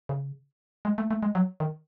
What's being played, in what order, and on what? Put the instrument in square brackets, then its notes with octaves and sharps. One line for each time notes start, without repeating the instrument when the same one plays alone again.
[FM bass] C#3
G#3
A3
A3
G#3
F#3
D#3